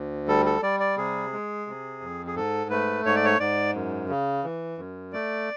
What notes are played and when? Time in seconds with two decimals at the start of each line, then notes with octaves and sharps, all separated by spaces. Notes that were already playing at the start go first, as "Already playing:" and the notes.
Already playing: D2
0.28 G3 A4
0.46 A4
0.62 G3 D5
0.80 D5
0.98 C3 G#4
1.32 G#3
1.67 C3
2.01 F2
2.27 G#4
2.36 G#2 A4
2.70 A3 B4
3.05 G#2 C#5
3.16 D5
3.25 C#5
3.40 G#2 D5
3.75 F#2
4.09 C#3
4.44 E3
4.78 F#2
5.13 A3 D5